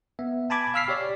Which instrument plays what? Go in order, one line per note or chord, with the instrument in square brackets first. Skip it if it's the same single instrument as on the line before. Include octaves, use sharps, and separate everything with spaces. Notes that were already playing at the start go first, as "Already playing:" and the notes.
[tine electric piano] B3 E5
G#5 A5 B5 D6 G#6
F5 B5 E6 F6 B6 C7
G4 C#5 D5